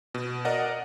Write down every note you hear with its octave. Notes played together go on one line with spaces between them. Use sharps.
B2
A#4 D5 D#5 F#5